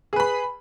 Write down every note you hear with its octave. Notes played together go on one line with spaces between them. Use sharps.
G#4 B4 B5